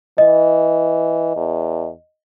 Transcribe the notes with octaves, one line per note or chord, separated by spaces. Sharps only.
E3 D#5
E2